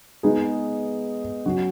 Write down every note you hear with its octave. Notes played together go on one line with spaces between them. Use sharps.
G#3 B3 D#4 G#4
F#3 C#4 F#4